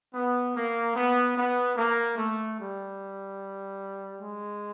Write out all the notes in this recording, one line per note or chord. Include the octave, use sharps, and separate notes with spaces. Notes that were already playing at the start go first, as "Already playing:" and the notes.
B3
A#3
B3
B3
A#3
A3
G3
G#3